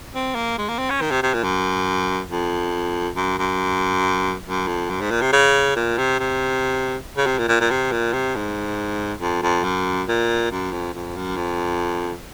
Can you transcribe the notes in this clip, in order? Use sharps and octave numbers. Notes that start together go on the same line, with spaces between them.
C4
A#3
G#3
A#3
C4
C#4
D#3
C3
C3
A#2
F#2
F2
F#2
F#2
F#2
F2
F#2
G#2
A#2
C3
C#3
A#2
C3
C3
C#3
C3
A#2
A#2
A#2
C3
A#2
C3
G#2
F2
F2
F#2
A#2
F#2
F2
F2
F#2
F2